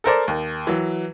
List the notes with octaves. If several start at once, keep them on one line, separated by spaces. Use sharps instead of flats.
A4 A#4 C5 D5
D#2
E3 F#3